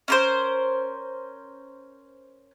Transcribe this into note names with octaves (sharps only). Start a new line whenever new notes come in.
C#4 A#4 C5